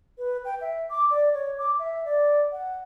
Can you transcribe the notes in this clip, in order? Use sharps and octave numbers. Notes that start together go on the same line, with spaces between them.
B4
G5
E5
D6
D5
C#5
D6
E5
D5
F#5